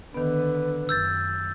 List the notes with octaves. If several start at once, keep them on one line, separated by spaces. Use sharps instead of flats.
D3 D#3 B3 B4
F#2 E6 G6 A6